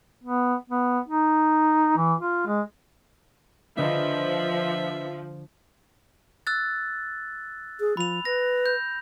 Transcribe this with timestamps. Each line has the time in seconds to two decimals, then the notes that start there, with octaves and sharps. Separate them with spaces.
0.24 B3
0.70 B3
1.08 D#4
1.97 E3
2.21 F4
2.47 G#3
3.78 D3 F3 D4 B4 D#5 E5
6.47 E6 F#6 A6
7.80 G#4
7.97 F3 B5 F7
8.25 B4 A#6
8.66 G6